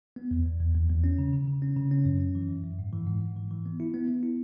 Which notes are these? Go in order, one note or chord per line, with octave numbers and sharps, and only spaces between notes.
B3
E2
E2
E2
E2
E2
C#4
C#3
C#3
C#3
C#4
C#3
C#4
F#2
C#4
E3
F#2
F#2
G#2
E3
G#2
G#2
E3
E3
B3
E4
B3
B3
E4